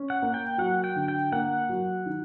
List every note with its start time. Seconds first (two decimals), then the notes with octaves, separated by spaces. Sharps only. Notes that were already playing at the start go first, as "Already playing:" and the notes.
Already playing: C#4
0.10 F#5
0.22 A#3
0.34 G5
0.58 F#3 F#5
0.84 G5
0.96 D3
1.08 G5
1.32 A#3 F#5
1.69 F#3
2.06 D#3